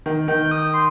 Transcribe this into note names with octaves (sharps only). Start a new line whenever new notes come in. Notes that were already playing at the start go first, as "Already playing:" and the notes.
D#3
D#3 G6
D#6
C6